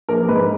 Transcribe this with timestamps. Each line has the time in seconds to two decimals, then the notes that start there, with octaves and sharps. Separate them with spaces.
0.09 A#1 A#4
0.28 G#2 B4